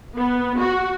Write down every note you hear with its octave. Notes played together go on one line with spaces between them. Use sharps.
B3
F#4